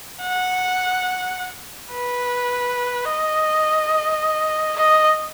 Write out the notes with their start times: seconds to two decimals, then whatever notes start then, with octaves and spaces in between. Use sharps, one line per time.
0.22 F#5
1.92 B4
3.05 D#5
4.76 D#5